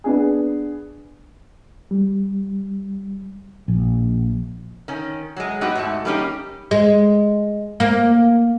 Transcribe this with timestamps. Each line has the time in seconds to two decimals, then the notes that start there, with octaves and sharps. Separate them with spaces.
0.04 B3 D4 G#4
1.91 G3
3.68 A#1
4.88 D#3 C#4
5.36 F#3 G#3
5.61 G#2 F#3 B3 D#4 F#4 G4
5.75 G#2 A3 F#4 A5
6.05 G3 A3 A#3 C#4 D#4 G4
6.71 G#3
7.80 A#3